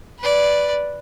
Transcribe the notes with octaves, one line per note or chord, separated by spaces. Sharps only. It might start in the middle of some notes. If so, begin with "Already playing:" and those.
B4 D5